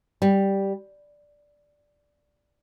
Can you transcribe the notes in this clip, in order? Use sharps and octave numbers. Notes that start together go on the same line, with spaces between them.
G3